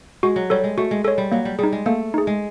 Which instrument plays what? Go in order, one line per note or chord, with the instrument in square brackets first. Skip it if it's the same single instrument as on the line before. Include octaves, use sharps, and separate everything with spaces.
[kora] G#3 [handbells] F#4
[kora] F#3
[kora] G3 [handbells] A4 C#5
[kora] G#3
[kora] A3 [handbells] F#4
[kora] G#3
[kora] G#3 [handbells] A4 C#5
[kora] G3
[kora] F#3 [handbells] A#3
[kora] G3
[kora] G3 [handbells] D#4 G#4
[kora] G#3
[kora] A3 [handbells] A#3
[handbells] D#4 G#4
[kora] G#3